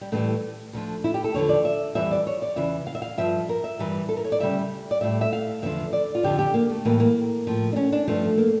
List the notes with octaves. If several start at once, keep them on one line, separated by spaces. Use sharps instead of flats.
G3
A2 E3 G3 A3
D2 D3 F3
E4
G4
A4
E2 D3 F3 C#5
D5
E5
F2 E3 G3 E5
D5
C#5
D5
E2 C#3 E3 E5
F5
E5
F5
G2 F3 E5
A#4
E5
G2 E3 G3
A4
A#4
C#5
D5
D2 C#3 G3 E5
D5
A2 G3 E5
E5
F5
E2 D3 F3 E5
D5
F4
F2 D3 F3 G4
G4
A#3
A3
A2 E3 G3 A#3
A#3
A2 F3
D4
C#4
D4
G2 F3 A3
A#3